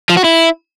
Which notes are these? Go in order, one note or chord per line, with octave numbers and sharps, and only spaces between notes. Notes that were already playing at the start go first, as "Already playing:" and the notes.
F3
F#4
E4